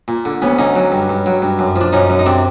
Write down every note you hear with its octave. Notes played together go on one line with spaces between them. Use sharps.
A#2
D3
D2 B3 C#4
D3 C#4 D#4
F#3
G2
G2
F#3
G2
F#2
F3
D4
F#2 C#4 D#4
F#2
D#4
C3 C4 D4